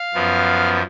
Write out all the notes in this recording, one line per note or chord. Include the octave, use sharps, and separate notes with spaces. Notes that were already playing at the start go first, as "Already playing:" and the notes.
Already playing: F5
F#2 F3 B3